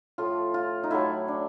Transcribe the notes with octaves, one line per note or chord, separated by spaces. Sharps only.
A2 F3 A3 F4
F4
D#4
A2 F#3 A3 E4
D4